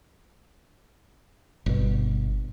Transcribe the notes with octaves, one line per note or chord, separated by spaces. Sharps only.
G1 B2